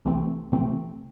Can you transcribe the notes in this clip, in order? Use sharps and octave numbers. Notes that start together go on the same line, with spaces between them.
C2 C3 E3 A3 C4
C2 C3 E3 A3 C4